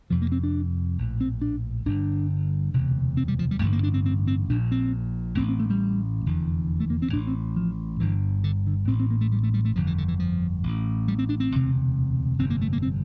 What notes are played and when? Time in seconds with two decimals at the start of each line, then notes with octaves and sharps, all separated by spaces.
0.10 F1 F2 C3 F3
0.22 A#3
0.32 C4
0.44 D4
0.98 A#1 A2
1.21 C4
1.42 D4
1.85 G1 G2 D3 D4
2.73 E1 D2 C3
3.17 C4
3.28 G3
3.39 F3
3.51 G3
3.61 A1 G2 D3 A3
3.73 A#3
3.83 D4
3.94 C4
4.05 C4
4.27 C4
4.49 A#1 A#2 D4
4.72 C4
5.37 A1 A2 C4
5.49 C4
5.60 A3
5.70 G3
6.25 F1 E2 D3
6.80 A3
6.90 A#3
7.02 C4
7.13 A1 A2 D4
7.27 C4
7.57 F3
8.00 G1 G2 D3 E3
8.44 D3
8.67 D3
8.88 A1 A2 C4
9.00 C4
9.10 A#3
9.21 A3
9.32 G3
9.43 A3
9.54 G3
9.65 A3
9.76 G1 F2 D3 F3
9.87 E3
9.98 D3
10.08 E3
10.20 F3
10.63 A1 A2
11.08 G3
11.19 C4
11.29 D4
11.40 C4
11.51 E1 D2 C3
12.39 G1 F2 C3 C4
12.50 A#3
12.61 A3
12.73 A#3
12.82 C4